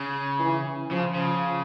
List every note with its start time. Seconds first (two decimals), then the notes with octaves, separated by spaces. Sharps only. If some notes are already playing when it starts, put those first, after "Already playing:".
Already playing: C#3
0.40 E3
0.91 C#3 F3
1.15 C#3